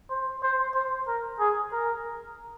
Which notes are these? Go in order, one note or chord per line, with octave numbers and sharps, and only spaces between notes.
C5
C5
C5
A#4
G#4
A#4